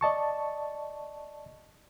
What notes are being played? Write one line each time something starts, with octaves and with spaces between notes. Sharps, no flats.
D5 D#5 A5 C#6